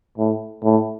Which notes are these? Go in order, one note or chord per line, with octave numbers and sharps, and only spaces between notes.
A2
A2